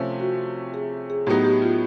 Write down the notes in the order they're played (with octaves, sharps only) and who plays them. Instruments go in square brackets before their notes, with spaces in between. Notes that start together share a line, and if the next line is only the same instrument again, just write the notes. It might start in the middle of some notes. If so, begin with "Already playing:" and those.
Already playing: [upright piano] C3 F3 A3 C#4
[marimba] F#4
G#4
G#4
[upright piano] A2 F#3 B3 D#4 [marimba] G4
[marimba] G4
F4